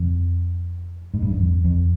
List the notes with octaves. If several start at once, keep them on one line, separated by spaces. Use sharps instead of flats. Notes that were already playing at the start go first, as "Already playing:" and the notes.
Already playing: F2
G#2
G2
F#2
F2
F2